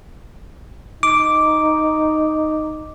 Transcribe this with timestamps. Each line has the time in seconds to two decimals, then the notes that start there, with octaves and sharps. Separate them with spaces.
1.03 D#4 D6